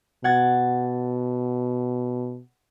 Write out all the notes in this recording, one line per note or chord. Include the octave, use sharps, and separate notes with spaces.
B2 F#5 G#6 A6